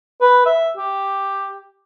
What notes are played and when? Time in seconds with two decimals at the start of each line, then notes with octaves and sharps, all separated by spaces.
0.21 B4
0.46 E5
0.77 G4